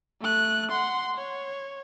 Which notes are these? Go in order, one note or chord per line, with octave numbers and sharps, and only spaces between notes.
A3 F#6
F#5 C6
C#5